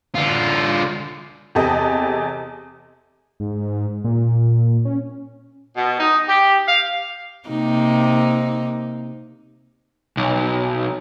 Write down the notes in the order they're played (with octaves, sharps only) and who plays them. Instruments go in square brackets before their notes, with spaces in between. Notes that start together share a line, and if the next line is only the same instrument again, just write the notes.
[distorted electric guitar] D3 F4
[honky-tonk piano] E2 C3 G4 A4 D#5 D#6
[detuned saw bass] G#2
A#2
C#4
[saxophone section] B2
D#4
G4
F5
[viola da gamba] C3 A#3 D#4
[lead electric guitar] B1